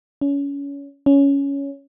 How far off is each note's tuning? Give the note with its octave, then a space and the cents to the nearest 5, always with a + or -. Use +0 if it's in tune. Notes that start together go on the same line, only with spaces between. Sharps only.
C#4 +25
C#4 +10